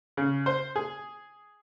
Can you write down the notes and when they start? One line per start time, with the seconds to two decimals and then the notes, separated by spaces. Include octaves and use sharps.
0.17 C#3
0.46 C5
0.76 G#4